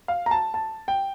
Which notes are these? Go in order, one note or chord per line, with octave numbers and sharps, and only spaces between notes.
F5
A#5
A5
A5
G5